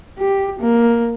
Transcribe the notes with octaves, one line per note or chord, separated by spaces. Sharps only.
G4
A#3